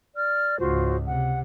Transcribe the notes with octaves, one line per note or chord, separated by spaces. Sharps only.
D5 F6
C#2 G#2 F4 F#4 C5
C3 F#5